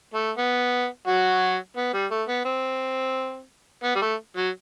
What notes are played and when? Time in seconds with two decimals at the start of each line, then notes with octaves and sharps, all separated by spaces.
0.14 A3
0.37 B3
1.07 F#3 F#4
1.77 B3
1.94 G3
2.11 A3
2.28 B3
2.45 C4
3.84 B3
3.96 G3
4.02 A3
4.37 F#3